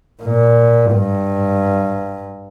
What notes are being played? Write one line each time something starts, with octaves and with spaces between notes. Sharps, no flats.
A#2
G2